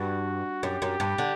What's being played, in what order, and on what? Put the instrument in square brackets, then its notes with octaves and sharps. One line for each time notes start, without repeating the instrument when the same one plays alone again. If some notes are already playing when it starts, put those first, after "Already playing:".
Already playing: [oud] G2 [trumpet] F#4
[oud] F#2 [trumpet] G4
[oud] F#2
G2
D3